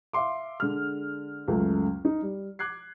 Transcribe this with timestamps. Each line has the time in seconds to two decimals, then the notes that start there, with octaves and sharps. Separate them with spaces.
0.13 E5 F5 C6 D6
0.60 D3 G#3 F6
1.48 C#2 F#2 A3
2.05 D#4
2.22 G3
2.59 D6 F#6 G#6 C7